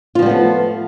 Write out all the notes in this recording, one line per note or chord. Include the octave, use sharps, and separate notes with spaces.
F3 G3 A3 B3 F4